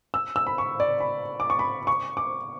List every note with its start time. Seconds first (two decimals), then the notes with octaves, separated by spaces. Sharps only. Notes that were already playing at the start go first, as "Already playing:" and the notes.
0.14 E6
0.36 E6
0.47 B5
0.58 C#6
0.80 D5
1.00 B5
1.40 D6
1.50 C#6
1.59 B5
1.87 C#6
2.17 D6